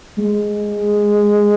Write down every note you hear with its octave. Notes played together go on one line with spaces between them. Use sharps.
G#3